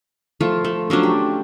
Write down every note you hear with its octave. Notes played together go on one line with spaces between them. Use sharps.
F3 A3 F4
A3
F3 F#3 C#4 D4
G4